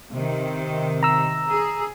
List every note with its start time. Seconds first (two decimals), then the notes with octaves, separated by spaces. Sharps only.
0.12 C3 D#3
1.03 A#5 E6
1.48 G#4